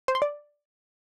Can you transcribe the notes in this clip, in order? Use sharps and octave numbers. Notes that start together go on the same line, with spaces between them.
C5
C6
D5